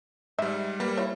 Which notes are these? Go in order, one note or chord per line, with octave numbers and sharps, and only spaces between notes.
G#2 G3 E5
G3 A#3 B4
E4 F4 C#5